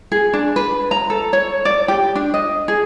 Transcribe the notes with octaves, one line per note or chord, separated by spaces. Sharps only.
G#4
D4
B4
A#5
A4
C#5
D5
G4
D4
D#5
G#4